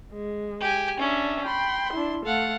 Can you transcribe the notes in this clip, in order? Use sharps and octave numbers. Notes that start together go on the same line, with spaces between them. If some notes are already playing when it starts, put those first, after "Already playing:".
G#3
G4 G#5
C#4 D4 E5
G5 B5 C6
D4 E4
A3 A4 F5 F#5